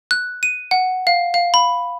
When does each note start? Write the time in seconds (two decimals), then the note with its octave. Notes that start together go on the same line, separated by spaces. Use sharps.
0.11 F#6
0.43 D#7
0.71 F#5
1.07 F5
1.34 F5
1.54 B5